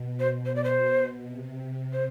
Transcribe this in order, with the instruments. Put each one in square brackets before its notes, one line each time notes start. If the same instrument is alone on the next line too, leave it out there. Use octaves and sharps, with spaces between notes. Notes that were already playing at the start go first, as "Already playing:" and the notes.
Already playing: [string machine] B2
[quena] C5
C5
D5
C5
[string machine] C3
[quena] C5